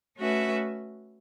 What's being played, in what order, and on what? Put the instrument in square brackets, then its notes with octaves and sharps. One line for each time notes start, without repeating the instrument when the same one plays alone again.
[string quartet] A3 C#4 F#4 B4 E5